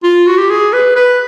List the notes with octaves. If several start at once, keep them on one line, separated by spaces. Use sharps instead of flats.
F4
F#4
G4
G#4
B4
B4